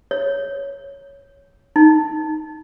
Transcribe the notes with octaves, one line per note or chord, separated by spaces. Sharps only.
C#5
D#4